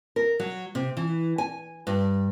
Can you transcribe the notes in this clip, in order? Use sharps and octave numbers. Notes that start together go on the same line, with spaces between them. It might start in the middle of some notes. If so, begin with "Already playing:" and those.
A#4
F#3
C3
E3
G#5
G2